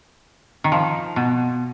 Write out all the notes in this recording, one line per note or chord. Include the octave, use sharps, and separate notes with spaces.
D#3
F3
B2